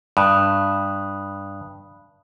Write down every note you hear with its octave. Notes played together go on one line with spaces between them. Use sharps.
G2 B5 D#6 F#6